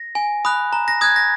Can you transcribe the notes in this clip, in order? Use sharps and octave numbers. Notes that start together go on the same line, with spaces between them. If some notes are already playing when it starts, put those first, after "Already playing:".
Already playing: A#6
G#5
B5 D#6 F#6
A#5
A#6
D#6 F#6 G#6
A#6